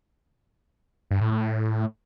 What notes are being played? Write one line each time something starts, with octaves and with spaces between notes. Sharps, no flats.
G2
A2
A2